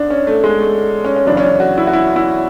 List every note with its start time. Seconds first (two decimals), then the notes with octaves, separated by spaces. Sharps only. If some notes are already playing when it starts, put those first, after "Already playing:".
Already playing: G#2 D4
0.10 C#4
0.27 A3
0.44 G#3
0.60 A3
1.05 C#4
1.16 C#4
1.27 F#2 C#3 E3 D4
1.37 C#4
1.43 D4
1.60 F#4
1.78 E4
1.87 F#4
1.93 E4
2.16 E4